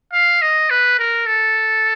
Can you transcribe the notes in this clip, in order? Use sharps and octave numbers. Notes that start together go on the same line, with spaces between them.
F5
D#5
B4
A#4
A4